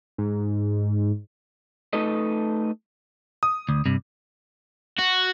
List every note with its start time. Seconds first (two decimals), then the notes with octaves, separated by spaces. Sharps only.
0.18 G#2
1.93 A3 D#4 A4 B4 D#5
3.43 D#6
3.69 D2
3.86 G2 C3
4.99 F#4